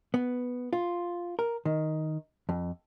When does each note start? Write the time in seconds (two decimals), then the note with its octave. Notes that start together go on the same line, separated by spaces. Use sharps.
0.14 B3
0.73 F4
1.39 A#4
1.65 D#3
2.49 F2